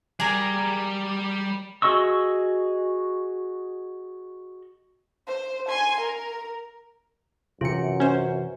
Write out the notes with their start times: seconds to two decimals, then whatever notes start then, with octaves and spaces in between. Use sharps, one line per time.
0.20 G3 G#4 A#4 D5
1.82 F#4 G#4 D#5 C#6 E6
5.27 C5
5.69 G#5 C6
6.01 A#4
7.61 F#2 C3 E3 F4 C#7
8.00 C#4 C5